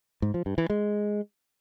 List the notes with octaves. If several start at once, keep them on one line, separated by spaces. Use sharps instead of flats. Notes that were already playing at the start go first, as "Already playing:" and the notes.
G#2
F3
G2
E3
G#3